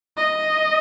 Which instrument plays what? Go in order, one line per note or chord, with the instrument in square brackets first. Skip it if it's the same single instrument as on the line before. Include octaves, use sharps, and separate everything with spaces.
[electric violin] D#5